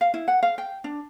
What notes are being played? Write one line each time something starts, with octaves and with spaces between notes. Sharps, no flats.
F5
E4
F#5
F5
G5
D4